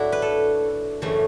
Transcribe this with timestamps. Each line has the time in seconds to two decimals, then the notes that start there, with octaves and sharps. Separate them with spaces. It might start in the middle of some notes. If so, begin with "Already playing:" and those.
Already playing: A2 F#3 A3 D4 E4 F#4
0.12 B4
0.22 A4
1.02 F#2 C#3 E3 A3